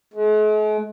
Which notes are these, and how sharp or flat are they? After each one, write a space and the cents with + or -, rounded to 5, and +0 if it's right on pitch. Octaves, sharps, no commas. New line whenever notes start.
G#3 +45